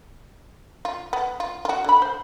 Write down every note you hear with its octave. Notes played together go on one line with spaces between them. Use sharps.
F4
B3
F4
F4 F#4
D3 B5
C5